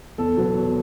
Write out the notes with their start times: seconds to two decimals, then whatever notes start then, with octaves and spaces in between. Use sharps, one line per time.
0.18 E2 A4
0.37 B2 F#3 B3
0.55 E2